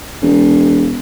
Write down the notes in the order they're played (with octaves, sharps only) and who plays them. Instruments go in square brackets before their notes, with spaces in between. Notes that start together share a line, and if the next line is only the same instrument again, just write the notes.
[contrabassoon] E1